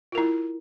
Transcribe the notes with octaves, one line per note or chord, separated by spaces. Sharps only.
E4 F4 A#4